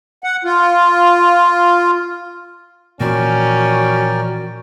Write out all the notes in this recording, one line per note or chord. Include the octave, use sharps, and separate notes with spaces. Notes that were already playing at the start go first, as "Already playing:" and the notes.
F#5
F4
A#2 E3 F3 C#4 F#4 A#4 D5 G5